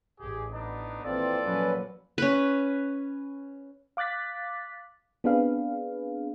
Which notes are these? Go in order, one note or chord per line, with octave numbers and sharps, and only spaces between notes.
A1 G4 G#4
B3 D4 D#4
A#1 E3 C4 F4 A4 D5
F3 F#3 A#3 C#4 B4
C#4 B4
F5 D6 F#6 A6 B6
B3 C4 D4 G#4 B4 F5